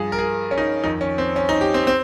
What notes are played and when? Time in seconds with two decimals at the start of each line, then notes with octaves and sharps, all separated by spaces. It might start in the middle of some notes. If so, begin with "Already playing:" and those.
Already playing: G2 F3 G#4
0.12 A#4
0.19 G#4
0.51 C#4
0.58 D#4
0.84 F2 D#3 D#4
1.01 C#4
1.18 C4
1.36 C#4
1.49 D#4
1.61 G4
1.74 C4
1.87 C4